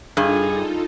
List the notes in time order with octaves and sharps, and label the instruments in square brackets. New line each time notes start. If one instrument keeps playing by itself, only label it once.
[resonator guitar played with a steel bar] G2 [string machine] D#4 F4 A4 [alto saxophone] G#4